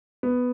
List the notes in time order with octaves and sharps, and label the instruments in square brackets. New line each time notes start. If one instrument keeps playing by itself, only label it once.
[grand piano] B3